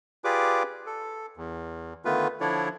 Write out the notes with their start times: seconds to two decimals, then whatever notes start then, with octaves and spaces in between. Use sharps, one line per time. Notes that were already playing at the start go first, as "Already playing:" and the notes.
0.24 F4 G4 G#4 B4 D5 D6
0.86 A4
1.37 E2
2.05 D3 D#3 A3 B3 F4 B4
2.41 D3 F3 D4 E4 C#5 D5